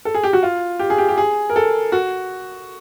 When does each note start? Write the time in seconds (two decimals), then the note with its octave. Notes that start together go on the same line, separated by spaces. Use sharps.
0.05 A4
0.15 G#4
0.24 G4
0.33 F#4
0.43 F4
0.79 G4
0.90 G#4
0.98 G4
1.09 G4
1.18 G#4
1.50 A#4
1.56 A4
1.92 F#4